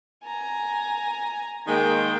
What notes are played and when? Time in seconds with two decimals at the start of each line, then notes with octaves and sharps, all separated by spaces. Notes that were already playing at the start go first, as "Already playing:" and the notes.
0.25 G#5 A#5
1.67 D#3 G#3 A#3 G5